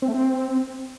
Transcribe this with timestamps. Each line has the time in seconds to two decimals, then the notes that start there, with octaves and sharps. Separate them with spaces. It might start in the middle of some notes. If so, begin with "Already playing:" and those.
0.02 C4
0.08 A3
0.14 C4